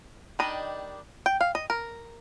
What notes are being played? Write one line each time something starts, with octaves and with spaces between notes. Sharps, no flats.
D#3 G3 D4 D#5
G5
F5
D#5
A#4